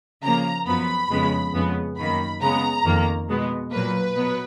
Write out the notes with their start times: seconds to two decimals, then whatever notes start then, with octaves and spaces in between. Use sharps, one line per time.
0.22 C#3 F3 A#3 A#5
0.66 F#2 F3 B3 B5
1.10 F2 C#3 G#3 B3
1.53 F2 C#3 G#3 B3
1.97 F#2 D#3 A#3 B5
2.41 C#3 G#3 B3 A#5
2.84 F2 D#3 A#3
3.28 B2 G#3 B3
3.72 A#2 F#3 A#3 B4
4.15 B2 F#3 B3